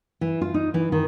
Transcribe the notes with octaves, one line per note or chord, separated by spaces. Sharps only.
E3
F4
D#4
E3
D#3